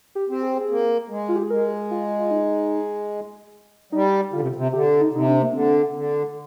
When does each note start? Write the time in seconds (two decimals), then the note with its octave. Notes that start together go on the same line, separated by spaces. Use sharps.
0.15 G4
0.29 C4 G4
0.42 G#4
0.69 A#3
1.10 G#3
1.29 F4
1.36 G4
1.43 G#4
1.50 G#3 A#4
1.91 F4
2.19 F4
2.31 D#4
3.92 G3 D#4
4.33 D3 F4
4.40 C3
4.56 C3
4.73 D3 G4
5.00 D#4
5.14 C3 D#4
5.28 D4
5.42 A#3
5.54 D3 C4
5.94 D3